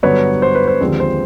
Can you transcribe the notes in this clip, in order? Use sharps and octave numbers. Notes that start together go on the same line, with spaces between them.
G2 D3 F#3 B3 B4 C#5
C5
B4
C5
D#2 D3 F3 G#3 C4
C5